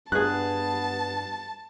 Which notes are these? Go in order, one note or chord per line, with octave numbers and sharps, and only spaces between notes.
G2 B3 G#4 A5 F#6